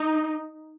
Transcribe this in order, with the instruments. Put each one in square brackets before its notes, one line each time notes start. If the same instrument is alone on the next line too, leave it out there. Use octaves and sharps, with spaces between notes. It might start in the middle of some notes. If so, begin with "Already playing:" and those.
Already playing: [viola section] D#4